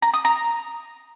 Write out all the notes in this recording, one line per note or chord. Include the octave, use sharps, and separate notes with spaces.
A#5
D#6
A#5